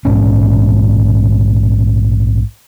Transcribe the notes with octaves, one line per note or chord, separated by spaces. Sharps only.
A#1 G#2 B2 C#4